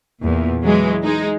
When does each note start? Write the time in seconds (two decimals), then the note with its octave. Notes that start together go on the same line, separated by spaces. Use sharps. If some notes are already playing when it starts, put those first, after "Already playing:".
0.21 E2 A#2
0.65 E3 F#3 G#3
1.03 G#3 D#4